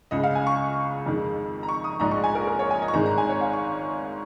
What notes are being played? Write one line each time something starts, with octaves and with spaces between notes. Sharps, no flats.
C#2 C#3 G#3 D#5
F5
G#5
C#6
F2 D#3 G#3
A#5
C#6
D#6
A#1 G#2 G#3 D#4 A#5
C#6
G#5
A#4
A#4
C#5
G#5
D#5
C#6
G#1 G#2 D#3 G#3 A#5
A#5
G#5
C#5
F5
C#6